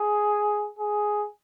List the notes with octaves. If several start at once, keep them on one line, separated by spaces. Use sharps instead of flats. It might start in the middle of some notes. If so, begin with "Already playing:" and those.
Already playing: G#4
G#4